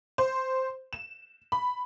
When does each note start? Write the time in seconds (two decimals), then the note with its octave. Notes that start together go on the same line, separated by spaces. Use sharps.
0.18 C5
0.93 E7
1.52 B5